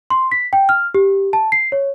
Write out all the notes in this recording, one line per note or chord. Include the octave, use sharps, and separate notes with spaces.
C6
B6
G5
F6
G4
A5
C7
C#5